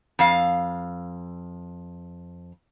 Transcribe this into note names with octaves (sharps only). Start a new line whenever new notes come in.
F2 F5